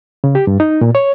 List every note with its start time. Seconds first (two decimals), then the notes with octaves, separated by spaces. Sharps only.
0.24 C#3
0.35 G4
0.47 G2
0.60 D#4
0.81 A#2
0.95 C#5